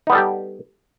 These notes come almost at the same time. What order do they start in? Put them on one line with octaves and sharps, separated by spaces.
D#4 B3 G3 A4 G4